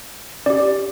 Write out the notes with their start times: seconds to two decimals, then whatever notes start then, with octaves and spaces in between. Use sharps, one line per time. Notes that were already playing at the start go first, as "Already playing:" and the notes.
0.46 C#4 G4 D5